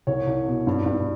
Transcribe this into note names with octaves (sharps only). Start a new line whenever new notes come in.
C2 C#5
C2
B2
G2
G2